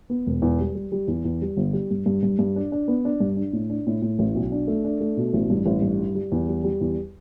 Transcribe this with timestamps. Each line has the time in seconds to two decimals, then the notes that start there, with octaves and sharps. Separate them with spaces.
0.10 B3
0.27 E1
0.42 E2
0.60 G3
0.75 G3
0.92 G3
1.08 E2
1.25 E2
1.42 G3
1.57 G1
1.73 G3
1.91 G2
2.06 G2
2.23 G2
2.39 G2
2.56 D4
2.72 D4
2.88 B3
3.05 D4
3.20 G2
3.37 D4
3.53 A2
3.70 D4
3.87 A2
4.02 A2
4.19 A1
4.35 B1
4.52 D4
4.67 A3
4.84 D4
5.00 A3
5.17 B2
5.33 A1
5.50 G2
5.66 A1
5.82 G2
5.99 G3
6.15 G3
6.32 E2
6.48 G3
6.64 G3
6.81 E2